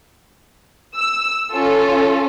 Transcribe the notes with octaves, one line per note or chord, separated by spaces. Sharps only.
E6
C#4 F4 A4